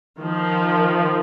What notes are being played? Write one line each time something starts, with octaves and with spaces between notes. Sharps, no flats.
D#3 F3